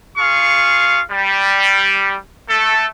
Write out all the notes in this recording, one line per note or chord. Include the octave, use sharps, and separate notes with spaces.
F4 G#4 F5 C#6
G3
A3 A4